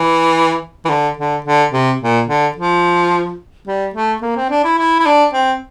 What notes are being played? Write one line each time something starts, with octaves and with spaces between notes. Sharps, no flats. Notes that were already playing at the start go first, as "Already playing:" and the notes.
Already playing: E3
E3
D3
D3
D3
C3
A#2
D3
F3
G3
A3
A#3
C4
D4
E4
E4
E4
D4
C4